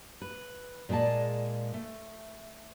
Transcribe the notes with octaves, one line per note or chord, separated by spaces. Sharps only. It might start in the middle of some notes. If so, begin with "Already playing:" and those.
B4
A#2 G#3 G#4 D5 A5
A3